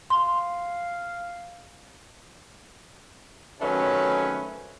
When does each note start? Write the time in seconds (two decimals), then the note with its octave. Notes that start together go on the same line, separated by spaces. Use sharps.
0.10 F5 C6
3.61 C3 D#3 F#3 A3 C#4 B4